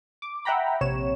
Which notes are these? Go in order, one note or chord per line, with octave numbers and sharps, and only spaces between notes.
D6
E5 F#5 G5 A#5 B5
A#1 C3 C#5 E7